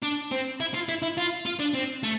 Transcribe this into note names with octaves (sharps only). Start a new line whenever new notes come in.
D4
C4
E4
F4
E4
E4
F4
F4
D4
C4
A3